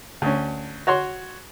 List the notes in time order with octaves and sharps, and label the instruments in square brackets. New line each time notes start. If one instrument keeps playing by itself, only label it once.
[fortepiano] D2 C#4
F#4 C#5 C6